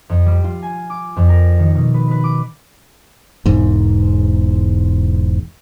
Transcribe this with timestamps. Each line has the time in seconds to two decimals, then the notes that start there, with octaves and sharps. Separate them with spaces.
0.09 F2
0.26 G3
0.44 F4
0.63 G#5
0.90 D6
1.16 F2
1.29 A#4
1.59 D#3
1.75 B2
1.94 B4
2.11 B4
2.24 D6
3.46 E1 E2 G#2